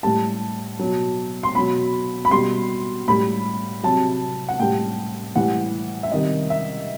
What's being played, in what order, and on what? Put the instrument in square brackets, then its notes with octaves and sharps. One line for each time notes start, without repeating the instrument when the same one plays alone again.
[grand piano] A2 G3 A5
B2 F#3
C6
B2 F#3 B5
B5
B2 G3 C6
A2 G3 B5
C3 F#3 A5
F#5
A2 G3 G5
A2 E3 G3 F#5
E5
C3 D#3 G3 D#5
E5